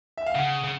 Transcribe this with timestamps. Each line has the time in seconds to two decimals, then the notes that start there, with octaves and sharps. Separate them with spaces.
0.17 E5
0.26 F5
0.35 C#3 F#5
0.64 C#3